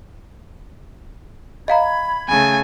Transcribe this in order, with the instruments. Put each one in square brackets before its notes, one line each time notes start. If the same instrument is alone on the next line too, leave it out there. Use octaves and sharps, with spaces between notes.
[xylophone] D#5 F5 A#5 [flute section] B5 G#6
[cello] C#3 A3 [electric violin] G#5